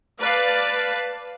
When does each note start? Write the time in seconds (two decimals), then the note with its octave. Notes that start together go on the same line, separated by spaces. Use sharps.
0.20 B4 D5 F5 A5